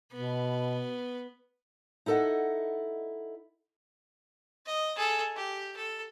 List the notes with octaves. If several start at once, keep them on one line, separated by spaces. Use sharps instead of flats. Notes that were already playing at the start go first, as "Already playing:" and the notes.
B2 B3
D#4 E4 A4 A#4 D#5 F#5
D#5
G#4 A4
G4
A4